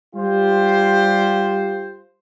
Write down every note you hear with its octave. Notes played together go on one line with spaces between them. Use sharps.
G3 F4 G4 C5